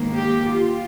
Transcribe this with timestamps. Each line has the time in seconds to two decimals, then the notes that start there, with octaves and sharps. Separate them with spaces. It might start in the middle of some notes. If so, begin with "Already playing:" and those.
Already playing: G#2 D#3 A#3
0.14 G4
0.52 F4